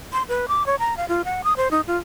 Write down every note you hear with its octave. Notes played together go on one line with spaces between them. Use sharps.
C6
B4
D6
C#5
A#5
F5
F4
F#5
D#6
C5
D#4
F4